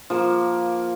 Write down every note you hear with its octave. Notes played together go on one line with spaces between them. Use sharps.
F3 A#3